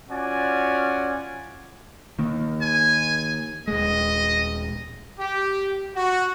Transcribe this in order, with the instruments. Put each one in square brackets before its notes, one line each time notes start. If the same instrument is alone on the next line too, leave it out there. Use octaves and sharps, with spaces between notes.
[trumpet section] C#4 F4 F#4 D5 G#5
[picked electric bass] D#3 A#3
[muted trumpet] G#5
[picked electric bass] D#1 G#3 [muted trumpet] D#5
[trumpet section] G4
F#4